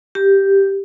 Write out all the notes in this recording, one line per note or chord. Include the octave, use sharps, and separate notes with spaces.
G4